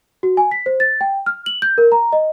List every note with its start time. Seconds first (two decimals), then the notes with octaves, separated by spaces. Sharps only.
0.23 F#4
0.37 G#5
0.51 B6
0.66 C5
0.80 A6
1.01 G5
1.26 F6
1.46 F#7
1.62 G6
1.78 A#4
1.92 A#5
2.12 D#5